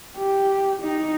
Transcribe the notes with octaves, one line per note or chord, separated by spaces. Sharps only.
G4
D#4